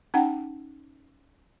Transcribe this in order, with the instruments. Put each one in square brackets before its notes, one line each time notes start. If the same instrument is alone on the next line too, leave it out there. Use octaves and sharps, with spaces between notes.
[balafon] C#4 D#4 F#5 G5 A5